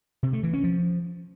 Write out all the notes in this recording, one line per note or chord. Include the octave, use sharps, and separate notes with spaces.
C3
A3
E3
C#4
F3